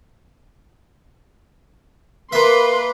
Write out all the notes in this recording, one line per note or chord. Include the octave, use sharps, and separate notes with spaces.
A#3 B4 E5 C6